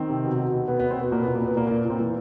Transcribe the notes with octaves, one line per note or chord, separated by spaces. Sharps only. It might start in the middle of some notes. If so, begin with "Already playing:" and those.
Already playing: D#3 C4
C3
B2
B2
B2
B2 B3
B3
B2
C4
B2 B3
A#2 A#3
B3
A#2
A#3
A#2 B3
A#2 A#3
A#3
A#2
A#2 C4
E3